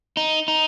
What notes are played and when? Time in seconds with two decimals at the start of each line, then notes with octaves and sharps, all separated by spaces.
0.17 D#4
0.48 D#4